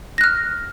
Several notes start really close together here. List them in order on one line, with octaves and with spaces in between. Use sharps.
A#6 F#6 F6